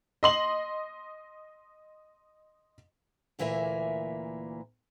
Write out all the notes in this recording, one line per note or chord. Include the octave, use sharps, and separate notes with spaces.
D#5 C6 F#7
D2 A#2 E3 A#3 E5 G#5